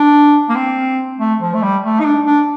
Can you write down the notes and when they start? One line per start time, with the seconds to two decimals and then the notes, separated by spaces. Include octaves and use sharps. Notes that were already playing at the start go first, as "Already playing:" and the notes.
Already playing: D4
0.49 A#3
0.55 C4
1.19 A3
1.41 F3
1.54 A3
1.62 G3
1.83 A3
2.00 D#4
2.05 D4
2.25 D4